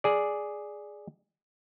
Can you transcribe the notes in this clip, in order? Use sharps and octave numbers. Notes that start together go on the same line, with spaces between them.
G#4 D5